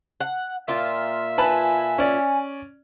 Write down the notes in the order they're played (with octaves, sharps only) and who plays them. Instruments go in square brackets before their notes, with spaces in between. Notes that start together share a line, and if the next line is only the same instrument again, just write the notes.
[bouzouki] F#5
[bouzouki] A#2 F4 [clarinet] E5
[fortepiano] B4 A5 B5 [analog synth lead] G#5
[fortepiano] C#4 D5